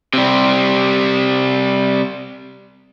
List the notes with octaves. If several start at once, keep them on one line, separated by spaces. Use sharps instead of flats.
C3 G3